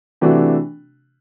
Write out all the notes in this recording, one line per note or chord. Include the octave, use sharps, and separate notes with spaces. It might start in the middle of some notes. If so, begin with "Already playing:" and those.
C3 E3 A3 D4 F#4